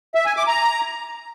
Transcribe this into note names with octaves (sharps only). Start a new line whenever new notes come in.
E5
G#5
D6
A#5